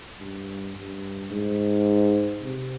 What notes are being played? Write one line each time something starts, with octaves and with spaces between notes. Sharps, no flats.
G2
G2
G#2
C3